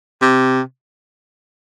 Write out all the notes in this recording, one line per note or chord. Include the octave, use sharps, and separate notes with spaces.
C3